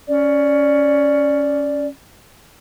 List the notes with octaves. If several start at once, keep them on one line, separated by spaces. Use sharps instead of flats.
C#4 D5